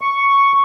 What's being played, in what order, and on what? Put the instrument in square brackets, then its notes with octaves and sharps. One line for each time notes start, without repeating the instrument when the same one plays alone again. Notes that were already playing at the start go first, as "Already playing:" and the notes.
[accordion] C#6